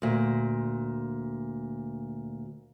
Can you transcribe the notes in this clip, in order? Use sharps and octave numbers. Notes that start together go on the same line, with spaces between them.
D2 A#2